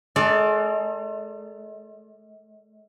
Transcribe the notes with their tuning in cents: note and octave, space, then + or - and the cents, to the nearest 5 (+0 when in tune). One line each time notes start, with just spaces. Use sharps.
G#3 +45 A4 +40 D5 +0